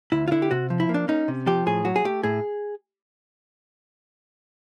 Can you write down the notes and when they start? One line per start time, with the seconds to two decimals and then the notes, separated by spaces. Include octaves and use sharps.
0.12 D2 E4
0.28 F4
0.31 D3 E4
0.42 G4
0.51 C3 F#4
0.70 F3
0.80 E4
0.89 A#3
0.94 D4
1.08 C#4 D#4
1.28 C3
1.47 F3 G4
1.66 A2 G#4
1.85 F#3 F#4
1.96 G#4
2.04 A3 G4
2.23 A2 G#4